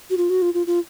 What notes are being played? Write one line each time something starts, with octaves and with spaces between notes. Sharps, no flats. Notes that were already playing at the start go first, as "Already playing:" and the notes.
F#4
F4
F#4
F4
F4
F4